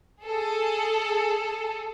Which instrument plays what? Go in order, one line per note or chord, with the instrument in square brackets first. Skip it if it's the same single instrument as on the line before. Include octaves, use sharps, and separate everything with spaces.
[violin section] G#4 A4